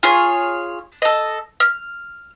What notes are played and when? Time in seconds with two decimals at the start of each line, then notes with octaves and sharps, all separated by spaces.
0.03 F4 G#4 C#5
1.02 A4 D#5
1.60 F6